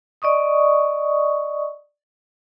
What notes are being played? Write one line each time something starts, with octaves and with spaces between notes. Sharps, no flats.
D5 D#5 C#6 D#6